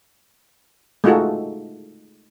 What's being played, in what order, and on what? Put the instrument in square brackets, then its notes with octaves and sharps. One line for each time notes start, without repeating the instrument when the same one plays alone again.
[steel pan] G#3 A3 D#4 F4 F#4 A4